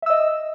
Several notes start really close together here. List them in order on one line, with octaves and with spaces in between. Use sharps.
E5 E6 D#5